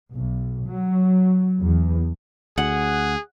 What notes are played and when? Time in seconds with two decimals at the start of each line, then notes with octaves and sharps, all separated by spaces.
0.14 B1
0.66 F#3
1.63 E2
2.58 D2 G#4 F#5